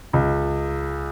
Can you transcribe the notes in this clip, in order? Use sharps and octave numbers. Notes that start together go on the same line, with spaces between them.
C#2